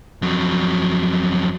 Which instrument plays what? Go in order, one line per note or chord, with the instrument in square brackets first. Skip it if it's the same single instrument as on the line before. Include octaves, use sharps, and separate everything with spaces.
[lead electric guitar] F2 F#3